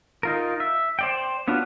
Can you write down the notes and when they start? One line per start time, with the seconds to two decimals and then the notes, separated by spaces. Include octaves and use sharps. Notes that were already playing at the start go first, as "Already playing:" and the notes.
0.23 D#4 F4 A#4
0.60 E5
0.99 C5 D5 G5
1.48 B3 C#4 D4 F4 F#4